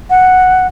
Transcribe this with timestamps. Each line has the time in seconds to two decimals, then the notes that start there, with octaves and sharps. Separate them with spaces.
0.10 F#5